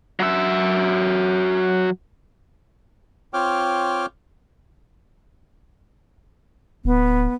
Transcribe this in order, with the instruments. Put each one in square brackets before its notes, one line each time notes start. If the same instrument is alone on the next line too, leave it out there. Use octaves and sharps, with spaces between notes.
[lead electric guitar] F#3 E5
[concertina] C4 F4 C#5 G5 D6 F6
[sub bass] D1 [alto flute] B3